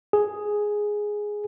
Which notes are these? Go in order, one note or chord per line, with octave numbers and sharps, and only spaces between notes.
G#4